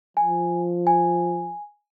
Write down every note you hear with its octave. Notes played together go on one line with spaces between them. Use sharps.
F3 G#5
G#5